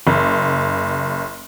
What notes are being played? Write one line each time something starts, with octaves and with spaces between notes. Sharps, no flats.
F#1